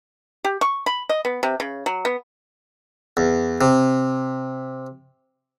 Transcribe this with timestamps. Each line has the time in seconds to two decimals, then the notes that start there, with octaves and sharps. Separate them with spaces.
0.44 G4
0.61 C#6
0.86 B5
1.09 D#5
1.25 B3
1.43 C3
1.60 C#3
1.86 F#3
2.05 B3
3.17 E2
3.61 C3